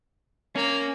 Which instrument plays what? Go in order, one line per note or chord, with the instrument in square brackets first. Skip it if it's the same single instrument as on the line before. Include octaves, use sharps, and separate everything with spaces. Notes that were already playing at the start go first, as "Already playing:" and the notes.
[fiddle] A#3 [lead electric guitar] C#4